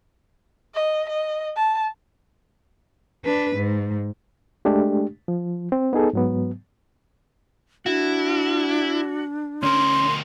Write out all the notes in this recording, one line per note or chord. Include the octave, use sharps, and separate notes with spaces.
D#5
D#5
A5
D4 B4
G#2
G#3 A3 D4 G4
F3
C4
B3 D#4 G#4 A4
G#2 F#3 B3
D4 E4 F#4
D2 C#4 A#4 C6